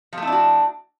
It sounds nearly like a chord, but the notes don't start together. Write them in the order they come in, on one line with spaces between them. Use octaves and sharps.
F3 A3 E4 D4 F#4